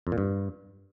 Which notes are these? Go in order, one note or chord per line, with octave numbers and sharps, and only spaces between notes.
F2
A#2
G2